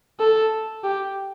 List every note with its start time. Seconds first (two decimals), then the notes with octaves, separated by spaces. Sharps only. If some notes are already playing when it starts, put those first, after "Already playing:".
0.20 A4
0.84 G4